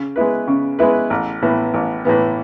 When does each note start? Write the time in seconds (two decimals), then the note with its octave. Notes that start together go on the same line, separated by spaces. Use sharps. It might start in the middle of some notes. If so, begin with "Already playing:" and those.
Already playing: C#3
0.16 G#3 B3 E4 B4
0.48 C#3
0.79 G#3 B3 E4 B4
1.10 A1
1.42 A2 E3 B3
1.74 A1
2.05 A2 E3 B3